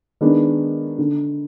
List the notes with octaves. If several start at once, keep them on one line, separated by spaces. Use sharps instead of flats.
D#3 G#3 B3 D4
D3